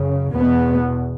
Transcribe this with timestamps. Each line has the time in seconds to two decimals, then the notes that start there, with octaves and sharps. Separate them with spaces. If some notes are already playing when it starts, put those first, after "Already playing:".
Already playing: F#2 C#3
0.32 E2 B2 B3